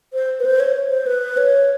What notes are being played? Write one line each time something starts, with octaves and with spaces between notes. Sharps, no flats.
C5
B4
C5
C#5
C5
B4
C#5